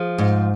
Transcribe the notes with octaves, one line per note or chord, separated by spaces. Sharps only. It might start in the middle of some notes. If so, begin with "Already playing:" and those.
Already playing: F3 G#4
G#2